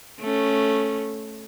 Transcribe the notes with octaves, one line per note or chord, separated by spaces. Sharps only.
A3 C#4